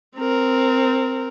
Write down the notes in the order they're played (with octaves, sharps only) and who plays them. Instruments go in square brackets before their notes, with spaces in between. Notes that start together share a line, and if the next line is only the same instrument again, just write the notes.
[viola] C4 A#4